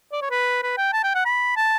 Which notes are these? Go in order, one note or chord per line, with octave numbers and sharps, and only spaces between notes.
D5
C#5
B4
B4
G5
A5
G5
F#5
B5
A5